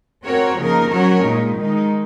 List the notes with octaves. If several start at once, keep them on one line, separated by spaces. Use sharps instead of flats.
C4 F#4 A#4 C#5
C#3 F3 A#3 D#4 A#4
F#3 C#4 F#4 A#4 C#5
A#2 G#3 D#4
D#3 G#3 D#4